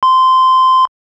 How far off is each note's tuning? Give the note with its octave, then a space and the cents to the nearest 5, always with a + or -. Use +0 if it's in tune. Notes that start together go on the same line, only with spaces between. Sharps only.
C6 -15